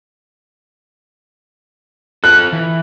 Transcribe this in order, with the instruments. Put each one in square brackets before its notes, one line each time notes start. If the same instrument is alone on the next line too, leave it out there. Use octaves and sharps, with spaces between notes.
[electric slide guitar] F4 A4 [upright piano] F#6
[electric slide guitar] E3